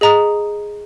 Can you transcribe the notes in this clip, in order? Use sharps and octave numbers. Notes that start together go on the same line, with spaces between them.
G#4 D#5 A#5 D#6